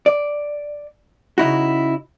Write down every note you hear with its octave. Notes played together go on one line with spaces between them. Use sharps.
D5
C#3 D#4 E4 F#4